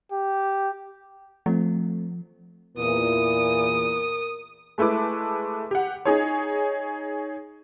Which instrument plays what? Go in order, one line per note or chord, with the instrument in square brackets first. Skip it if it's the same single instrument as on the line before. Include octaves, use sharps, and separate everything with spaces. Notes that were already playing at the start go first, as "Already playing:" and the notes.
[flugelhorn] G4
[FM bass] F3 [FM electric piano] A3 C4
[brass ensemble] E2 A#2 E3 [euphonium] A#4 [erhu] D#6
[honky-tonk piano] G#3 A3 E4 B4 D6
G4 F#5
D#4 G#4 C#5